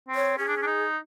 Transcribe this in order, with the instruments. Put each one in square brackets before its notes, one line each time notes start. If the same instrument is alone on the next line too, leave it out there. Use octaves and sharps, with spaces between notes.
[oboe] C4
[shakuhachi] C#5
[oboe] C#4 [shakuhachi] G#4
[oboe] D4
C#4
D4
D#4